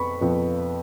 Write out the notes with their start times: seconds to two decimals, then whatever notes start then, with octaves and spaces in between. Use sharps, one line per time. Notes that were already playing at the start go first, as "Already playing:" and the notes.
Already playing: F2 B3 B5 C#6
0.21 F2 F3 B3